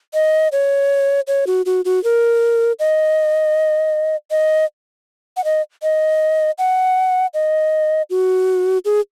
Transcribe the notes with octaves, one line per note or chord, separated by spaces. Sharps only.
D#5
C#5
C#5
F#4
F#4
F#4
A#4
D#5
D#5
F#5
D#5
D#5
F#5
D#5
F#4
G#4